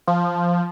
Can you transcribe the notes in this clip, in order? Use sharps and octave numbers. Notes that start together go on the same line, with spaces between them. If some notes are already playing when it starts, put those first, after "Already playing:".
F3